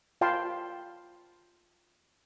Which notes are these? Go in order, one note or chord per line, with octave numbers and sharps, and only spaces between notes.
F4 F5 G5 A5 B5 C6